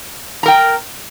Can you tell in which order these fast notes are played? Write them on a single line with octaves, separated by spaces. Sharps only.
A#5 A#4 G5